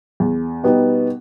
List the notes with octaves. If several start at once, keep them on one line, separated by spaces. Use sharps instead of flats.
E2
B2 G3 B3 D#4